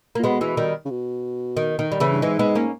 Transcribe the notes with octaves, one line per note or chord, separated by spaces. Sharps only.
A#3
A#2
B2 G#3 B3
E3 G#3
D#3 G3
C#3
B2
D#3
D#3
G3
C#3 E3
G2
G#2 E3 G#3
G#3 B3
A#3 C#4